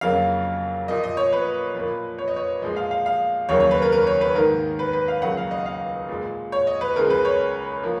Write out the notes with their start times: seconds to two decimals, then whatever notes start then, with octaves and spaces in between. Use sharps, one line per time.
0.01 F2 C#3 F#3 A#3 F5
0.88 A#2 F3 A#3 D#5
1.04 D#5
1.17 C#5
1.32 B4
1.75 A#2 F3 A#3
2.18 C#5
2.28 D#5
2.36 C#5
2.62 A#2 F3 G#3 D#5
2.76 F5
2.91 F5
3.06 F5
3.49 D#2 C#3 F#3 A#3 C#5
3.60 C#5
3.71 B4
3.82 A#4
3.92 A#4
4.07 C#5
4.21 B4
4.35 G#2 D#3 A#3 A#4
4.79 B4
4.93 B4
5.08 F5
5.22 C#2 C#3 F#3 A#3 F#5
5.37 F5
5.51 D#5
5.66 F5
6.09 A#2 G#3
6.52 C#5
6.67 D#5
6.81 B4
6.96 C#2 C#3 G#3 A#4
7.10 B4
7.25 C#5
7.83 F3 A#3